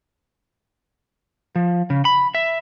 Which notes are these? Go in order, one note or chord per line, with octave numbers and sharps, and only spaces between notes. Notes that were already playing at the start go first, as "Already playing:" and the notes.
F3
C#3
B5
E5